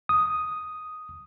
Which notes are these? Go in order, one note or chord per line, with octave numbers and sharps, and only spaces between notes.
D#6